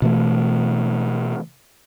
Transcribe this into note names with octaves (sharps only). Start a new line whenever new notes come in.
B2 E3 A3